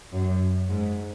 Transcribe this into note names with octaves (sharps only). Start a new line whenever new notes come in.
F#2
G#2